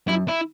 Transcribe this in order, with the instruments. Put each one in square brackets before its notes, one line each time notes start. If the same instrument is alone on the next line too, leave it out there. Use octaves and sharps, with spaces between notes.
[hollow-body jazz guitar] F#2 [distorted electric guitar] E4
[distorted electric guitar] E4